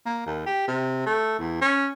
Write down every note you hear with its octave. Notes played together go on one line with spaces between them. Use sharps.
A#3
D#2
G4
C3
A3
E2
C#4